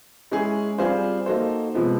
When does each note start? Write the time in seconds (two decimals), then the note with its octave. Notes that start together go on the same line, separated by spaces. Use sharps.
0.31 G#3 C#4 E4 G#4
0.78 G3 C4 F4 G#4 C5
1.26 A#3 D#4 F#4 A4 C5
1.74 C3 F3 G#3 B3